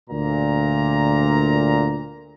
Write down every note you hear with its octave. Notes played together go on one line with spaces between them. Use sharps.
D2 A#2 A#5